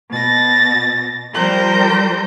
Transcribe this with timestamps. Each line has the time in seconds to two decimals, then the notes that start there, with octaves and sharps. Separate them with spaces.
0.11 B2 A6 A#6
1.33 F3 G3 A#4 C5 G6 A#6